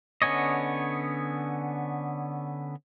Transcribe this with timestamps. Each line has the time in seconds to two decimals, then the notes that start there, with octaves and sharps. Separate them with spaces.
0.22 D3 B3 C#4 C#5 D#5